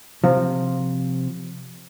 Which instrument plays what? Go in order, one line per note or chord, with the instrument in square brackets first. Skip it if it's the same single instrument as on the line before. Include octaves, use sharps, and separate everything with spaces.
[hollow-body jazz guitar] C3 F3